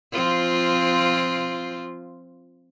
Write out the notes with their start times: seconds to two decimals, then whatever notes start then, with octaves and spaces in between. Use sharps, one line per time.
0.12 F3 C4 F4